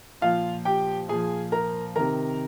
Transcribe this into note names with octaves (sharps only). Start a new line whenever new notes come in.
A#2 F3 F4 F5
G4 G5
A#2 F3 G#4 G#5
A#4 A#5
C3 D#3 A#4 A#5